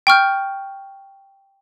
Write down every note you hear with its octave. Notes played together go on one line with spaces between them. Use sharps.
G5 C#6 F6 G6